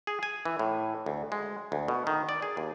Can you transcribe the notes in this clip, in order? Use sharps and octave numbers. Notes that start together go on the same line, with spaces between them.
G#4
G#5
E3
A2
D2
G#3
D2
B2
D#3
D5
G#4
D#2